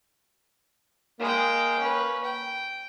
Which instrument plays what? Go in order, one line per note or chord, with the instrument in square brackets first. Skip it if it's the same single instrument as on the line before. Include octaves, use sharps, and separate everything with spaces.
[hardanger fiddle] G#3 G5 [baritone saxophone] A#3
[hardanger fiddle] C#4 B4
G5